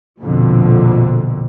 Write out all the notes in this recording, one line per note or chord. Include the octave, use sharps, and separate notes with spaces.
A#1 F2 B2 D3